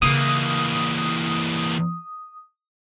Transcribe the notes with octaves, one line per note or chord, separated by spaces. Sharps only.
C#3 E3 A#3 F4 D#6